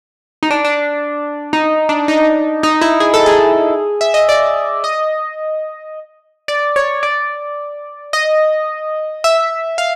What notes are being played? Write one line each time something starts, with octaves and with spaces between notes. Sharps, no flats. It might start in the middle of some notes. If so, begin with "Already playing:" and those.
D#4
D4
D4
D#4
D4
D#4
D#4
E4
G#4
A4
G#4
E5
D#5
D5
D#5
D5
C#5
D5
D#5
E5
F5